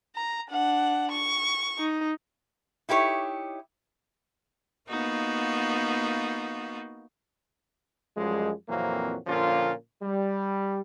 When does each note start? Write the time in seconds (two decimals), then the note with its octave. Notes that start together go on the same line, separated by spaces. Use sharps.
0.16 A#5
0.50 D4 F#5
1.12 C#6
1.79 D#4
2.89 D#4 E4 G4 B4 C#5
4.89 A#3 B3 D#4 F4 F#4
8.17 F#2 F3 G3 G#3
8.69 F2 A#2 E3 F#3 A#3 C4
9.27 A#2 D3 F3 A#3 C#4 F4
10.03 G3